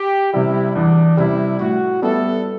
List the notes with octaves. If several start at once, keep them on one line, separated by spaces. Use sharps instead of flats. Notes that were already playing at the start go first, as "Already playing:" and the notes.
Already playing: G4
C3 G3 E4
E2 D4
C3 G3 E4
A2 F#4
G3 B3 E4 A4